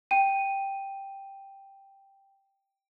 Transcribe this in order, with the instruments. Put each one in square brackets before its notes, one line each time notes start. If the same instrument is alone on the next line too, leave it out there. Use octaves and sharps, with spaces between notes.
[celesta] G5 D#7